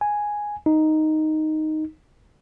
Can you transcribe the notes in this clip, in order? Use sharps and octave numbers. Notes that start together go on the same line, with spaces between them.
G#5
D#4